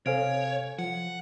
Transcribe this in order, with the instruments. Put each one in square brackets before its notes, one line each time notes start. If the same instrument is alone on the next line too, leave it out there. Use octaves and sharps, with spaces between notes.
[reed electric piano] C3 F5 G#5 [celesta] A4 C5 D7 [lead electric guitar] C#5
[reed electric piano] F3 [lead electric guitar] F#5